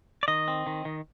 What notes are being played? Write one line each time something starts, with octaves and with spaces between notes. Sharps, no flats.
D5
D#3 D#5
C4
D#3
D#3